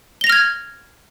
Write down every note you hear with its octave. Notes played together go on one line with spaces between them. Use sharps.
F6 G#6 A#6 F7 G7